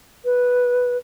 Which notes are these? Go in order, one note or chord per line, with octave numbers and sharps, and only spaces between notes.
B4